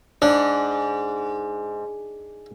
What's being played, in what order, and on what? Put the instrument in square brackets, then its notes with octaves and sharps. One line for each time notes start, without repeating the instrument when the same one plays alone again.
[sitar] G#2 [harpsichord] D4